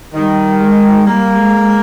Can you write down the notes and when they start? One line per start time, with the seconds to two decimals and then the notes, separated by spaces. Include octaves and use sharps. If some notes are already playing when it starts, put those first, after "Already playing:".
0.14 D#3 G3
0.60 G#3
1.05 G3 A#3
1.36 G#3